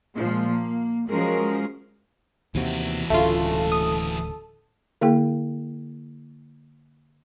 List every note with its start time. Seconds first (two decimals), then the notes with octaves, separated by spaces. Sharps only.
0.15 A#2 F3 G#3
0.51 A#3
1.08 F3 F#3 G#3 C#4 G#4 A#4
2.55 D#2 C3 E3 F#4
3.10 D1 D2 C#3 A3 F4 A4
3.72 D#6
5.01 D3 A#3 E4 G#4 G5